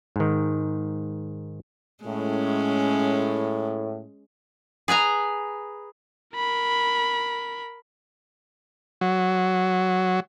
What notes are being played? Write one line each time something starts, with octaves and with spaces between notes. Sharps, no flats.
G#2 D#3
A2 G#3 C#4
G#4 B4 G#5 A#5
A#4 B5
F#3